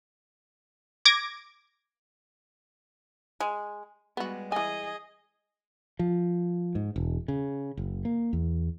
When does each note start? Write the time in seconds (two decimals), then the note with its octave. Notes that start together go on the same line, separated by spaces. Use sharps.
1.05 D6 G#6 A#6 D7
3.40 G#3
4.17 G3 G#3 B3 F#4
4.52 E3 G#4 D#5 G#5
5.99 F3
6.75 G#2
6.96 E1
7.28 C#3
7.77 F#1
8.05 A#3
8.33 E2